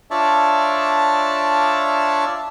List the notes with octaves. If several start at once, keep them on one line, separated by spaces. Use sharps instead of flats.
D4 F4 C#5 D5 E5 A5